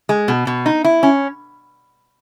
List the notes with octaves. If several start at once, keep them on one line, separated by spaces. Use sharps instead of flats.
G#3
B2
B2
D#4
E4
C#4